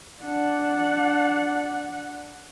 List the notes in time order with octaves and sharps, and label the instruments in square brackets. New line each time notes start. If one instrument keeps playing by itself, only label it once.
[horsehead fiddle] D4 F#5